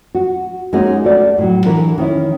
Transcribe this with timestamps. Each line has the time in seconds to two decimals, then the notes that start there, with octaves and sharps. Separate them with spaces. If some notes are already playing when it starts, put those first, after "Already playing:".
0.15 F#4
0.73 G#3 A#3 C#4 D#4 F#4
1.04 A3 F#4 D5
1.38 A2 F#3
1.66 D3 E3 A#4
1.98 D#3 C#4 E4